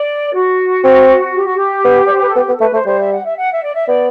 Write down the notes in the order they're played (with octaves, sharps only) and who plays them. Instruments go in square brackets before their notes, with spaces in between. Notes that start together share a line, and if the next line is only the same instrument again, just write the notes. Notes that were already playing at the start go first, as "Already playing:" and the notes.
Already playing: [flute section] D5
F#4
[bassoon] C4
[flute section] G4
F#4
G4
[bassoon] B3
[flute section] D5
C5
B4
A4
[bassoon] B3 [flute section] G4
[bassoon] B3 [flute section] A4
[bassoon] A3 [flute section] B4
[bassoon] A3 [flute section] C5
[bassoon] G3 [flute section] C5
[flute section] E5
F#5
E5
F#5
E5
D5
E5
[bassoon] B3 [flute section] D5